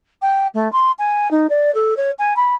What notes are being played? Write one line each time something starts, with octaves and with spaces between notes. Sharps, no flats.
G5
A3
C6
G#5
D#4
D5
A4
C#5
G#5
B5